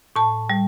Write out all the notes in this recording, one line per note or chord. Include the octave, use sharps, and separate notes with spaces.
A2 A5
G3